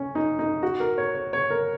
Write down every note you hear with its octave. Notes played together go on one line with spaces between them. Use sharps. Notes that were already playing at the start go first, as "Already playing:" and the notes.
Already playing: C#4
D#4
D#4
F#4
A#4
C#5
C#5
C#5
A#4